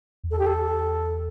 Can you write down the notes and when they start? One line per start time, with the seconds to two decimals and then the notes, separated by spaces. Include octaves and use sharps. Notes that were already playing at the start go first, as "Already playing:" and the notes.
0.24 E2
0.31 A4
0.39 G4
0.46 A4